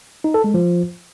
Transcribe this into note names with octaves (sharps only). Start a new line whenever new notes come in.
D#4
A4
G#3
F3